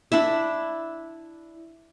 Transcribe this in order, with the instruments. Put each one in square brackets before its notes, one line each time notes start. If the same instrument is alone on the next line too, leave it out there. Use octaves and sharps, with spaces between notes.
[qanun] D4 E4 E5